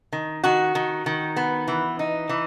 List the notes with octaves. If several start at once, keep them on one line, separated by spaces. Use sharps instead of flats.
D#3
D#3 F#4
D#3
D#3
B3
E3
D#4
E3